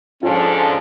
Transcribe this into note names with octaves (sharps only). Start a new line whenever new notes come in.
G#2 D3 F3 C#4 F4